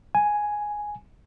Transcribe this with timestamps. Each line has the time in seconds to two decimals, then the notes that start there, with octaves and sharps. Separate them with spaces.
0.15 G#5